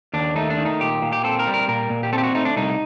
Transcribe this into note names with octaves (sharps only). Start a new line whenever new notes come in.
D#2 D4
A3 D#4
D4
D#3
D#4
A#2 G4
A#2
G4
C4 A4
A#4
G3
A#4
A#2 A#4
A#2
G4
C4 A4
G4
F#4
A3 D#4
D4
C2 D#4